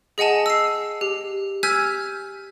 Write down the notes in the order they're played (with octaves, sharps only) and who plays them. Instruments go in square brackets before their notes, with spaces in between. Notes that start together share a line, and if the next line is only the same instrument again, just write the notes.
[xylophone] G#4 D#5 F#5 G#5 A5
E6 C7
G4
G#5 E6 F6 G6 G#6 B6